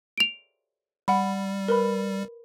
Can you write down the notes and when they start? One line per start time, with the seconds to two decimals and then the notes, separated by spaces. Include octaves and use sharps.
0.18 D7 F7
1.08 G3 F#5 B5
1.68 A#4 B4 B5